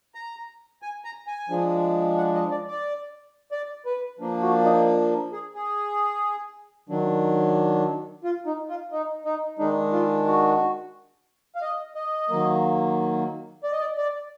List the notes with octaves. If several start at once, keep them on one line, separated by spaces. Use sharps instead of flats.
A#5
G#5
A#5
G#5
F3 G#3 D4
F#5
D#5
D5
D5
D5
B4
F3 A#3 D4
F#4
D#4
G#4
G#4
D#3 F#3 D4
F4
D#4
F4
D#4
D#4
D#3 G#3 D4 D#4
F4
F#4
F5
D#5
D#5
D#3 F#3 A#3
D5
D#5
D5
D5